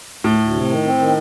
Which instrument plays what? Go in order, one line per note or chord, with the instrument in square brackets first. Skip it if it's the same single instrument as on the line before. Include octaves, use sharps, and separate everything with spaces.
[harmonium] D2 [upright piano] A2
[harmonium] D2
C3
D#3
C4
D#3